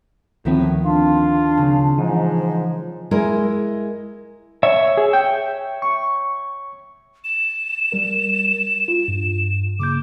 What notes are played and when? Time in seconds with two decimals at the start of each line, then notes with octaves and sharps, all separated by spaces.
0.45 D2 A2 D#3 F3 B3 C4
0.84 D4 F4
1.57 C#3
1.98 G#2 E3 F3
3.11 G#3 E4 A#4
4.63 C#5 E5
4.97 G#4
5.13 G5
5.82 C#6
7.24 E7
7.92 G3 A#4
8.88 F4
9.08 G2
9.80 C#3 A#3 D6 G6